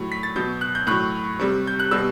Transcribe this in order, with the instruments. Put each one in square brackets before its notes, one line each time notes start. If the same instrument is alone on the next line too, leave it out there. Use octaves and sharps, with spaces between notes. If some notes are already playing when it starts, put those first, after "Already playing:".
Already playing: [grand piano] A2 F#3
B6
A6
B2 F#3 G6
F#6
G6
A2 F#3 F#6
C3 G3
G6
F#6
B2 G3 E6